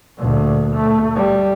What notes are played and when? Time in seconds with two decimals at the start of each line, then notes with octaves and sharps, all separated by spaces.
0.17 D2 A#2
0.76 A3
1.15 G3